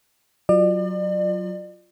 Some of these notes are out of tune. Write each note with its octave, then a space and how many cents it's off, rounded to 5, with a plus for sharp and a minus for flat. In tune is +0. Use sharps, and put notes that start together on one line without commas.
F#3 +0 F4 +0 D5 +40